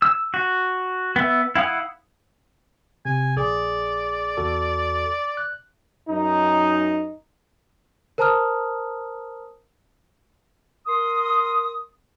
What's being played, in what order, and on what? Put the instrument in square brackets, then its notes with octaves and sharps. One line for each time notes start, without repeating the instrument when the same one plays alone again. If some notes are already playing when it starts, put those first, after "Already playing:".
[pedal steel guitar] E6
F#4
B3 E5
E4 F5 F#5 D#6
[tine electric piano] C3 [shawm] G#5
[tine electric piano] A#1 G#4 [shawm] D5
[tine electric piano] E2 F#4 A4
F#6
[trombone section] F#2 D#4
[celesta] A#4 C5 A5 A#5 D#6 F6
[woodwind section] A#4 C6 D#6